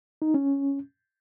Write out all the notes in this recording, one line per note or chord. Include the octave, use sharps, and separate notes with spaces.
D#4
C#4